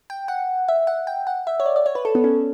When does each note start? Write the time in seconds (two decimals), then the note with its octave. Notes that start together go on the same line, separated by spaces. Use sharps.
0.10 G5
0.28 F#5
0.68 E5
0.87 F#5
1.07 G5
1.27 F#5
1.47 E5
1.60 C#5
1.66 D5
1.76 D5
1.86 C#5
1.95 B4
2.05 A4
2.15 B3
2.24 C#4